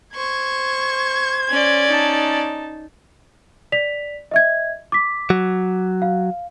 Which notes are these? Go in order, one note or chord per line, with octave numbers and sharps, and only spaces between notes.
C5 C#6 G#6
C#4 D5
D#4 A5
D5 B6 F7
D#5 E5 G#6
D6 B6
F#3
F5